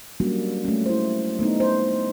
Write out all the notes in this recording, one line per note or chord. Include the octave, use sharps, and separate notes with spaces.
F#3 G3 A#3 C#4 D4 F#4
A3 C#4
E4 C5
A3 B3 D4 D#4
C5